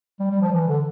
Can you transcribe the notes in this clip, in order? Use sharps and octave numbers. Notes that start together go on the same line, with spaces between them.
G3
G3
F3
E3
D3